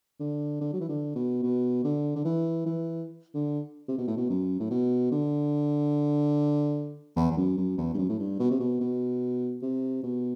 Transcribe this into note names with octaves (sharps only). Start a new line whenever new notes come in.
D3
D3
F#3
E3
D3
B2
B2
D3
D3
E3
E3
D3
C3
B2
A2
B2
F#2
A2
B2
D3
E2
E2
F#2
F#2
E2
G2
F#2
A2
G2
B2
C3
B2
B2
C3
B2